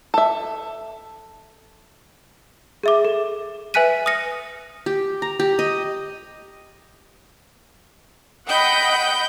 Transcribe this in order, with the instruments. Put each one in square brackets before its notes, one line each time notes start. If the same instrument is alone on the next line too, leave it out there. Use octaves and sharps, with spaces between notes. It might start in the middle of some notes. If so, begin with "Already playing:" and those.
[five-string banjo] A4 E5
[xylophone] G#4 E5 D6
A4
B4 E5 G#5 F#6 B6 D#7
D#6 F6 A#6 C#7
[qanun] G4
A#5
G4
D#5
[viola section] D#5 F#5 B5 [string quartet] G5 G6